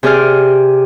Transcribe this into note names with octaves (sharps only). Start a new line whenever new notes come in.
C3 G4 G#4 D5 F6